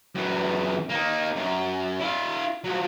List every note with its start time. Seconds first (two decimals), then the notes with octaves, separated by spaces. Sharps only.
0.15 F#2 E3
0.89 A#3 D#4
1.36 F#2
2.00 E4 F5
2.64 F3 F#3